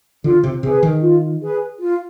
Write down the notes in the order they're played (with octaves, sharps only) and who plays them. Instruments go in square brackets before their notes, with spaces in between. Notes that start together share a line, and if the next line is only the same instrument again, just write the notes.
[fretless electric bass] D3 [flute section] F4
[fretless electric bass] C3
[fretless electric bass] C3 [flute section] G#4 B4
[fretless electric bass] D#3
[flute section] F4
G#4 B4
F4